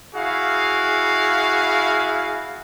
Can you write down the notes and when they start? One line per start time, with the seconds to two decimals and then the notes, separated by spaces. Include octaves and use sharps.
0.15 E4 F#4 G#4 F5